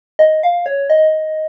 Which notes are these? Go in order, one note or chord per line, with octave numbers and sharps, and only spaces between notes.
D#5
F5
C#5
D#5